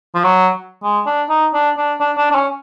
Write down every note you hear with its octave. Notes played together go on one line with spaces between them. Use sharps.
F3
F#3
G#3
D4
D#4
D4
D4
D4
D4
D4
C#4